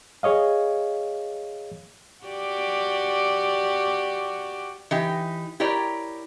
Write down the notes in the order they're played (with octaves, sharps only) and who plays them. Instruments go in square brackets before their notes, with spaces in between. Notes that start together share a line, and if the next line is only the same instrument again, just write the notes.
[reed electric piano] G#4 C#5 D#5 F5
[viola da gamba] F#4 G4 D5
[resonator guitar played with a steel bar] E3 D#4 G4
E4 G4 A#4 C#5 D5